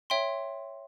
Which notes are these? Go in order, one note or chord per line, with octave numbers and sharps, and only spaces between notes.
C#5 E5 G5 C6